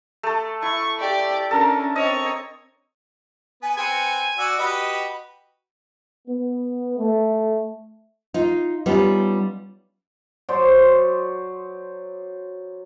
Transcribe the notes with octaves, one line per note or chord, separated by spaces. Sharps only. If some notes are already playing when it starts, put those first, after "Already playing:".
A3 A4
E4 C#6
G4 D5
C#4 D4 A4 A#4
C4 C#5 D#5
B3 G#5
C4 B4 F#5 G#5
F#4 D5 E6
F#4 G4 B4 D#5 B5
B3
A3
D#4 F4
G3 B3 C#4 D#4 F4
F#3 B4 C5 D5